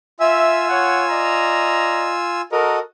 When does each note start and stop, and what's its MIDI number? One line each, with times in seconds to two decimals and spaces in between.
0.20 2.42 65
0.20 0.67 76
0.20 2.42 80
0.20 2.42 88
0.69 1.06 73
0.69 1.06 78
1.10 2.16 74
1.10 2.16 75
1.10 2.16 82
2.52 2.79 66
2.52 2.79 69
2.52 2.81 70
2.52 2.79 75